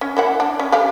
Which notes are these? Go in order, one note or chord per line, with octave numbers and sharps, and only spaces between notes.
C#4
A#3 E4 F#5
D4
C#4
A3 G4 F5